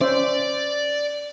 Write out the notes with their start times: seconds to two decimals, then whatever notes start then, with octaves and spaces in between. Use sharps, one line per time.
0.01 C#4 C5 D5 E5